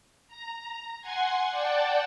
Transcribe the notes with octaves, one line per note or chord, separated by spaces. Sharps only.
A#5
F#5 G#5 C6 G#6
D5 F#5 G5 A5